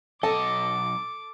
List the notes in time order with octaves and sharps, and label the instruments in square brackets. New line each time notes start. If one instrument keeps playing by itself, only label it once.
[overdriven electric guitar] B1 D#5 [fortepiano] A4 [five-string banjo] A5 [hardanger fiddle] D6